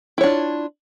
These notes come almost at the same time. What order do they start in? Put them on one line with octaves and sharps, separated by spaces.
E4 C#5 D4 F4